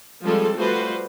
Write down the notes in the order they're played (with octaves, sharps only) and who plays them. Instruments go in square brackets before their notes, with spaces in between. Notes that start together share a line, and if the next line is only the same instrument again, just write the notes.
[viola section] F3 G3 G#3 C4 F4 A4
F3 G3 A3 F#4 B4 C5